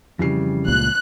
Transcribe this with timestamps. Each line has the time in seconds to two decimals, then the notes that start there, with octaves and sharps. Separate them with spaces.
0.19 F2 C#3 E3 G3 C7
0.68 C#2 A#2 F#6